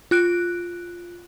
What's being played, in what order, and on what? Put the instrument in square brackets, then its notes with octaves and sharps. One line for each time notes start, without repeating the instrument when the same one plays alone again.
[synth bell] F4 F#6 D7